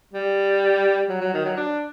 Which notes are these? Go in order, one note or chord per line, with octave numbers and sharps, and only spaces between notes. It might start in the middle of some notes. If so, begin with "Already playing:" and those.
G3
F#3
F#3
D#3
F#3
D4